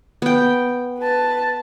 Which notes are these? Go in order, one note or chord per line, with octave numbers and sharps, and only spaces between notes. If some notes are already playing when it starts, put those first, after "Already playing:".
B3 G5
B4 A5